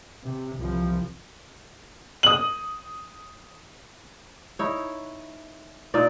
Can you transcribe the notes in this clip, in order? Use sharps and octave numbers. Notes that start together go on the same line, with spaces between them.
C3
C2 F3
D#6 F#7
D#4 E4 C#5
A#2 D#4 F4 D5